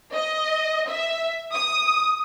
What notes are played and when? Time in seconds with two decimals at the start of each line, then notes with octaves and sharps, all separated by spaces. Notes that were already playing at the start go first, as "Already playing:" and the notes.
0.13 D#5
0.90 E5
1.54 D#6